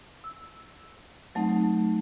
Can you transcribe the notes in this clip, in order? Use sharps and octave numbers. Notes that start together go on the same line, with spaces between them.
E6
F#3 A3 C4 D#4